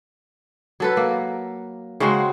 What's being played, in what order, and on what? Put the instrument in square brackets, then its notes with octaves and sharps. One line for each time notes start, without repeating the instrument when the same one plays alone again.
[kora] F#3 A4 B4
A#3
C#3 G#3 C4 F#4